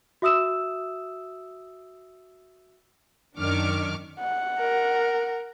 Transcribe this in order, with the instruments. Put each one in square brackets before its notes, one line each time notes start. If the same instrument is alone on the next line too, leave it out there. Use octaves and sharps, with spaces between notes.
[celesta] F#4 E5 D#6 E6 E7
[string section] F#2 D#3 D4 C#6 D6 F6
[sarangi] F#5
[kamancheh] A#4